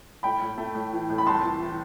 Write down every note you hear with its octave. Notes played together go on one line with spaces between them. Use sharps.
A2 G5 B5
A2
A3
A2
E3
A2
B5
C2 A5 C6
E3
E3